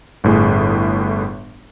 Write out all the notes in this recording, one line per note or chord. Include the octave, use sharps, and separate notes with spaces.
G1 A2 G#4